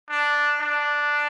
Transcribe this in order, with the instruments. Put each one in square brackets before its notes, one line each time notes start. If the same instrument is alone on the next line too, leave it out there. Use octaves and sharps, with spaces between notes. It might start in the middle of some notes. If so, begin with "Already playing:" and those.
[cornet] D4
D4